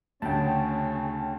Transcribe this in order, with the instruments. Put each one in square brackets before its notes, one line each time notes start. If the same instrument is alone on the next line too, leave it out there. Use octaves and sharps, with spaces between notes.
[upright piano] D2 [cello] C#3 [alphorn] C#4 [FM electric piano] G5 A5